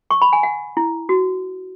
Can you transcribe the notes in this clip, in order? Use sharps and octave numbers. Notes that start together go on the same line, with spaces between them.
C#6
B5
G#5
F#5
E4
F#4